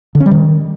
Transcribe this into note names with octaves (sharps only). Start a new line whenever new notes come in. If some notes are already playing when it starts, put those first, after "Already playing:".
D3
C#4
G3
D#3